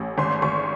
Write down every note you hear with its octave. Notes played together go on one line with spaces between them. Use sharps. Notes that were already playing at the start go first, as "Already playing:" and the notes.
Already playing: A1
G#1 C6
G#1 C#6